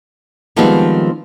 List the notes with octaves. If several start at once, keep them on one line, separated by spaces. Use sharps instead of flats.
D#3 F3 G3 G#3 B3 C4